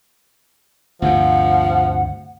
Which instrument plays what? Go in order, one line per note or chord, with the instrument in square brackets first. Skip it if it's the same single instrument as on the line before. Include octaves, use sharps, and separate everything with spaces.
[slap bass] D2 G2 C3 [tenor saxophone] F3 [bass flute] F#5